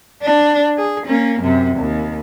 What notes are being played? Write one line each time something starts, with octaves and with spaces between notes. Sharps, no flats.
D4
G#4
A#3 C#4
F#2 C3
D#2